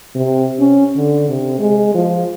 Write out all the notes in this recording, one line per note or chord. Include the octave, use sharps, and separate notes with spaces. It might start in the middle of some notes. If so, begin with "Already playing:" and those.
C3
C#4
D3
C3
G#3
F3